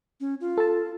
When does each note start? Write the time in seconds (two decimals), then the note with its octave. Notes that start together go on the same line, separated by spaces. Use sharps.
0.20 C#4
0.41 F4
0.58 A4 A5